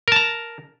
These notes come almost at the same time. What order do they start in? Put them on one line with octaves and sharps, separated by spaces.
A#4 A5 A#5